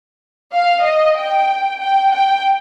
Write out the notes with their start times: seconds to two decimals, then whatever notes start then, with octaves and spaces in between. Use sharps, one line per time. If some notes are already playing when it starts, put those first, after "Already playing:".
0.52 F5
0.84 D#5
1.16 G5
1.80 G5
2.12 G5